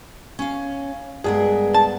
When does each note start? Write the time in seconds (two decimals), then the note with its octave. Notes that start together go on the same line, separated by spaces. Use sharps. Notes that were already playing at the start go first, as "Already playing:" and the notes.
0.39 C#4 F5
1.24 G2 G#3 B3 G#4 A#4
1.74 A5